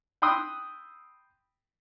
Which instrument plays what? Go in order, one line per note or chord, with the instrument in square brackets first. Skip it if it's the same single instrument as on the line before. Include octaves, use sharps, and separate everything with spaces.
[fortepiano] G5 B5 C6 D#6 E6 F#6